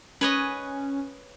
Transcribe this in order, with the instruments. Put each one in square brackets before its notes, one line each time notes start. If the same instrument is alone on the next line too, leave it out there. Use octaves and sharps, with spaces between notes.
[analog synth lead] C#4 [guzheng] B4 C#5 D#5